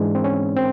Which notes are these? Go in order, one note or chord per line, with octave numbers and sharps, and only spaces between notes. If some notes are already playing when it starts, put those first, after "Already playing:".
Already playing: G#2 E3 G#3 D4
C4
C#4
C4